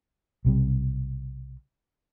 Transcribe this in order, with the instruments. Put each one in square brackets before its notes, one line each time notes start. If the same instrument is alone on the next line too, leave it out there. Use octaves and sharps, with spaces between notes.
[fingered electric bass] B1 C3 G3